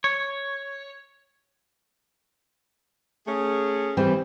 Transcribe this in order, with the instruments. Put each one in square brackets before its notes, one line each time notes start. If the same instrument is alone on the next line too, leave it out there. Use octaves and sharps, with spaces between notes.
[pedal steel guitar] C#5
[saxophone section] A3 C#4 G#4
[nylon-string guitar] E3 G3 C4